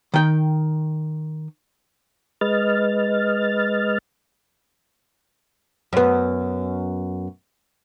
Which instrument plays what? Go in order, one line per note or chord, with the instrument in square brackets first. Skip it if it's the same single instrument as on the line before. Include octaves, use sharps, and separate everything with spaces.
[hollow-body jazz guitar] D#3 G5
[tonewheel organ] G#3 B4 D#5 F6 A6
[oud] F#2 B3